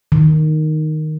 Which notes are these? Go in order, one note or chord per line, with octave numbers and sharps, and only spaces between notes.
D#3